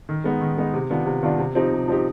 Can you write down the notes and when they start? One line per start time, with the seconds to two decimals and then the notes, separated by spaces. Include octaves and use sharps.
0.09 D#3
0.24 G#3 B3 D#4
0.41 D#3
0.58 G#3 B3 D#4
0.74 C3
0.90 D#3 B3 D4 F4
1.06 C3
1.23 D#3 B3 D4 F4
1.39 C3
1.55 F3 C4 D#4 G4
1.71 C3
1.88 F3 C4 D#4 G4